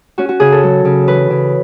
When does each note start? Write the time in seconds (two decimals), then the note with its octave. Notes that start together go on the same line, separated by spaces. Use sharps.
0.18 C#4 F#4
0.29 F#4
0.40 C#3 G#4
0.52 A4
0.63 F#3
0.85 C#3
1.07 E3 B4
1.30 C#3